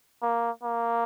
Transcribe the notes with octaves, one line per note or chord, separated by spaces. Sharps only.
A#3
A#3